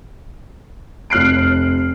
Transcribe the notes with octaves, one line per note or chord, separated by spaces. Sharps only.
F1 F6 F#6 C7 D7